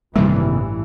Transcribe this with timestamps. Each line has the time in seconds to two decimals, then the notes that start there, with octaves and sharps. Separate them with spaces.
0.16 A1 G2 C3 D#3 E3 G3 A#3